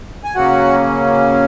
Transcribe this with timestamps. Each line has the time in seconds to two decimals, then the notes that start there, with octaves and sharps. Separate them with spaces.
0.24 G#5
0.35 C#3 F#3 A#3 C#4 F#4 F#5